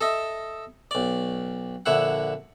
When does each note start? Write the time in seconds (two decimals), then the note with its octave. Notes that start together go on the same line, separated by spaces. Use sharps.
0.01 A4 D#5 E5
0.91 B1 D5
1.86 A#1 D3 E4 E5 F#5